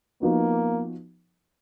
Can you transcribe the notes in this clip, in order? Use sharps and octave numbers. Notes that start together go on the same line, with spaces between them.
F3 A#3 B3 D#4 F#4